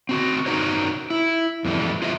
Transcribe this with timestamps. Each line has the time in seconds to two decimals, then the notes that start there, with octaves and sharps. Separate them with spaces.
0.09 C4 F#4
0.46 D#4 F#4 A#4 C5 C#5
1.10 E4
1.65 F2 E3 G3
2.02 F4 C5 D#5 E5